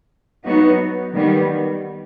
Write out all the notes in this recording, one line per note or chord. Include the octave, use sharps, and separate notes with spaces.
F#3 B3 D#4 F#4
D#3 G3 B3